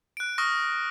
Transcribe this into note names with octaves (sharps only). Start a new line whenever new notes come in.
F#6 D7
C#6 D#6 F6 A#6